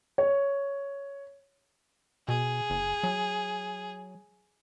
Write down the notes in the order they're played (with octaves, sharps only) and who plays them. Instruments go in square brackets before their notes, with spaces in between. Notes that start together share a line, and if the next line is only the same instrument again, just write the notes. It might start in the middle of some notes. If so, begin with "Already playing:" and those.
[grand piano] C#5
[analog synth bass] B2 [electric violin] G#4
[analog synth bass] F#1
F#3